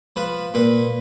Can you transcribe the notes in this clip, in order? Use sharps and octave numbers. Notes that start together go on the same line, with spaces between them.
F3 B4
A#2 B4